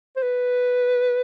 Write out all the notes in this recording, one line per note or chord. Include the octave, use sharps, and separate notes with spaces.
C5
B4